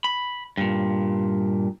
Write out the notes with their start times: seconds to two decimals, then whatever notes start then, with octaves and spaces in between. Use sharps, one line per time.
0.04 B5
0.57 G2 A#2